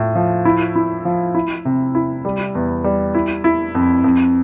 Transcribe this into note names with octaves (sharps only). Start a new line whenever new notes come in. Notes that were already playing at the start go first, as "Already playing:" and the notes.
Already playing: A2 F4
F3
E4
E4
F3
E4
C3
E4
G3
E2
G3
E4
E4
F2
F2